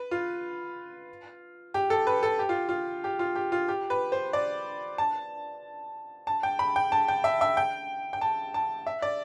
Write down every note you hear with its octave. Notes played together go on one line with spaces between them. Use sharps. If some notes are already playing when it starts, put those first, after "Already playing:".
Already playing: B4
F4
G4
A4
B4
A4
G4
F4
F4
G4
F4
G4
F4
G4
B4
C5
D5
A5
A5
G5
B5
G5
A5
G5
E5
E5
G5
G5
A5
A5
E5
D5